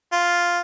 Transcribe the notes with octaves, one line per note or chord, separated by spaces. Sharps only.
F4